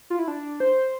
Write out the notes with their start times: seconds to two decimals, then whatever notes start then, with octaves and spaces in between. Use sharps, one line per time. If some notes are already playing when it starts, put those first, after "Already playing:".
0.10 F4
0.19 E4
0.28 D4
0.60 C5